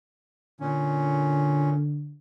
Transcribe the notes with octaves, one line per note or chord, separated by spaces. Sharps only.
A#2 D3 C#4